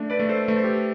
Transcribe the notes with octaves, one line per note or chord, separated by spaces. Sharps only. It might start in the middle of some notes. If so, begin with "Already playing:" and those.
Already playing: A3 D4
B4 D5
A3
A4 C5
A3 B4
C5
G4 B4